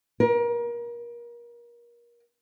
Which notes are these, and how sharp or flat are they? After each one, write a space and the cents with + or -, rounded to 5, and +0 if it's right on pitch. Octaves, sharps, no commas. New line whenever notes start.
A#4 +30